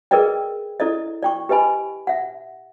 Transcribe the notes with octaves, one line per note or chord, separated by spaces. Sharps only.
G#4 A#4 B4 D5 D#5 G5
E4 A4 D5 D#5
D5 G5 C#6
G4 B4 D#5 G#5 B5
E5 F#5